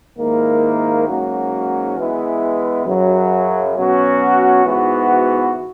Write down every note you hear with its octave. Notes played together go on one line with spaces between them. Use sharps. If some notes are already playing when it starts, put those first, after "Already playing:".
G#2 D#3 A#3 E4
G#2 F#3 A#3 C#4 F#4
E3 G#3 B3 E4
F#2 C#3 F#3
B2 F#3 C#4 F#4
G#2 E3 B3 F#4